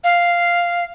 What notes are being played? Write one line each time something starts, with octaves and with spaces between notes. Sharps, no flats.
F5